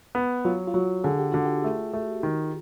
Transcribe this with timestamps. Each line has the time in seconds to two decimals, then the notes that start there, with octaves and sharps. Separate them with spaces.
0.15 B3
0.45 F#3 F4
0.67 F4
0.74 F#3 F#4
1.04 D3 G#4
1.19 G4
1.32 D3 F#4
1.45 G4
1.64 A3
1.93 A3
2.23 D#3